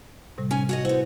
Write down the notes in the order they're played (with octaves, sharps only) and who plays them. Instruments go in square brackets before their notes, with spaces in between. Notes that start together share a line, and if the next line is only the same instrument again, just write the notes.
[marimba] A2 C3 G3
[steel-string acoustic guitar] C#4 G#5
F#4 C#5 D#5
[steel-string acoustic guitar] B3 F#4 [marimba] E4 [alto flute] C5